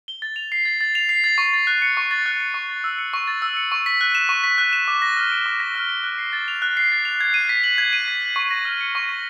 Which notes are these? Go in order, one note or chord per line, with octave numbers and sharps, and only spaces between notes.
G7
A6
F7
C7
A6
A6
F7
C7
A6
C#6
A6
F#6
C#7
C#6
A6
F#6
C#7
C#6
A6
E6
C#7
C#6
A6
E6
C#7
C#6
B6
F#6
E7
C#6
B6
F#6
E7
D6
A#6
F6
D7
D6
A#6
F6
D7
F#6
C7
A6
F7
F#6
C7
A6
F7
G#6
D#7
B6
F#7
G#6
D#7
B6
F#7
C#6
A#6
F6
C#7
C#6
A#6